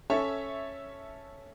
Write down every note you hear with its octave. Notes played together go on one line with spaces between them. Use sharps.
C#4 A4 C#5 E5 C#6